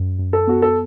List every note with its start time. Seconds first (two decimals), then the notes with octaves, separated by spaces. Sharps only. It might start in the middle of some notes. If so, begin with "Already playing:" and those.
Already playing: F#2
0.19 F#2
0.33 A4
0.47 B3 F#4
0.62 A4